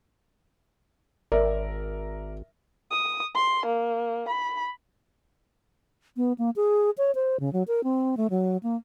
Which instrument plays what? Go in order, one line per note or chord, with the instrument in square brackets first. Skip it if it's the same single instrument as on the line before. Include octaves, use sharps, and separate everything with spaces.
[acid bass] G#1 [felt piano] A#4 D5 E5
[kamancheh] D#6
C6
A#3
B5
[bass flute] B3
A#3
G#4
C#5
C5
C#3
F#3
A#4
C4
A3
F#3
A#3